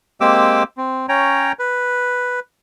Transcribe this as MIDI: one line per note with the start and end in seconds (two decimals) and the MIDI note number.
0.21 0.63 56
0.21 0.63 58
0.21 0.63 60
0.21 0.63 67
0.21 0.63 86
0.21 0.63 88
0.77 1.06 60
1.09 1.52 61
1.09 1.52 73
1.09 1.52 79
1.09 1.52 82
1.59 2.40 71